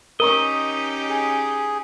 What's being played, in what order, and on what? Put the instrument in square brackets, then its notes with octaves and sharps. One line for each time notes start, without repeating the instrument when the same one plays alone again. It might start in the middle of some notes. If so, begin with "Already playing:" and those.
[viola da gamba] C#4 D#4 G4 [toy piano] A#4 A#5 C#6 [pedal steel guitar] D#5
[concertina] G#4